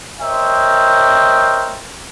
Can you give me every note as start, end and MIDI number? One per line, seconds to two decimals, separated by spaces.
0.20 1.84 70
0.20 1.84 72
0.20 1.84 73
0.20 1.84 75
0.20 1.84 76
0.20 1.84 79